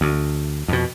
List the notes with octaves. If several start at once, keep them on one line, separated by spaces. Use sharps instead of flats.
D2
F2 B2